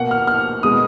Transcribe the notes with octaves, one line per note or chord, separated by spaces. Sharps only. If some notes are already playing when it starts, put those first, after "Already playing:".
Already playing: B2 A#3 F#5
F6
F6
B2 G#3 B3 D#6